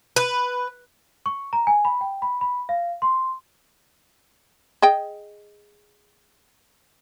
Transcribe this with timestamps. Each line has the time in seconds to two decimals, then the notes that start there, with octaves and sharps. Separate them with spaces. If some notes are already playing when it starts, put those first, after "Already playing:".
0.16 B4
1.26 C#6
1.53 A#5
1.67 G#5
1.85 B5
2.01 G5
2.22 B5
2.41 B5
2.69 F5
3.02 C6
4.82 G#4 D#5 G5